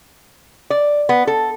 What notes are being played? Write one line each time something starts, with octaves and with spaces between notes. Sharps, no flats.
D5
B3
A4